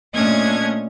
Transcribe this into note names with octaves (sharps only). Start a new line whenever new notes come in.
A#2 A3 C#4 D4 D#5 G#6